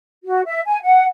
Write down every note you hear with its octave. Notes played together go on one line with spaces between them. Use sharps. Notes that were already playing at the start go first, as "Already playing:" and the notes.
F#4
E5
G#5
F#5